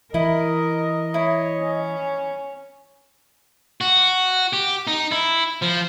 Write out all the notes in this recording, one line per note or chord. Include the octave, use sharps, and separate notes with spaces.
E3 E4 A#4 D#5
E4 C#5
C#4
F#4
G4
D#4
E4
F3